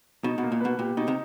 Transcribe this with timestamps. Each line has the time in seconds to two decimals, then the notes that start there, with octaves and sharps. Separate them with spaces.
0.24 B2 D#4
0.38 B2
0.43 A#3
0.52 A#2
0.60 B2 B4
0.79 A#2 G4
0.97 B2 D#4
1.08 C3